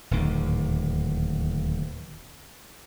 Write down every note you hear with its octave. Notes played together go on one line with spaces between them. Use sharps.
D1 D#2 A#2